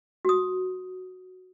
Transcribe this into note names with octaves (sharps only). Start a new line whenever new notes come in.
F#4 D#6